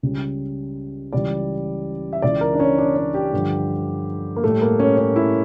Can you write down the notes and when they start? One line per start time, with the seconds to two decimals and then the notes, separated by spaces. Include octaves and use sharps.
0.03 C#2 C#3 G3
1.13 C#2 C#3 E3 G3 D5
2.13 E5
2.22 C#2 C#3 E3 D5
2.41 A#4
2.54 D4
2.59 C#4
2.78 D4
2.96 C#4
3.14 G4
3.33 G2 D3 F3
4.36 A#3
4.44 A2 G3 A3
4.62 A#3
4.79 C#4
4.98 C#4
5.16 E4